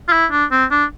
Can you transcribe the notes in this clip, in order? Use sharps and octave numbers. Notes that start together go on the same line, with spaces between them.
F4
E4
D4
C4
D4